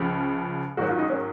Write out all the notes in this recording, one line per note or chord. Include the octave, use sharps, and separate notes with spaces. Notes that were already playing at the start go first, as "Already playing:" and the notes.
Already playing: C#2 C#3 F3
G#2 D#3 F#3 F#4
F4
D#4
C#4